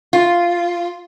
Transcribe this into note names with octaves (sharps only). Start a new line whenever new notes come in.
F4